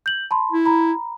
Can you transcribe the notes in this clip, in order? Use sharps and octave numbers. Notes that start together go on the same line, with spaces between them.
G6 F#7
A5 B5 C6
E4
A#5 B5